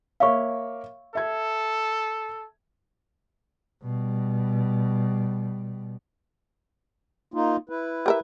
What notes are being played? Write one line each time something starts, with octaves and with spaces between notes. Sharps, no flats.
A#3 C#5 E5 F5 C#6
A4 E5 G#6
B2 G3
A#3 D#4 F4
E4 B4
G4 A#4 E5